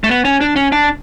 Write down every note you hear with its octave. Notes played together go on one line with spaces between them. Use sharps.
A3
B3
C#4
D4
C#4
D4